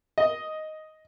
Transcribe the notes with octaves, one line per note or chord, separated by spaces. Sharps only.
D#5